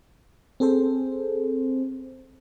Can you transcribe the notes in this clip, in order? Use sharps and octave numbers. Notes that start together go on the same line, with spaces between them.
C4 G#4 A4 C5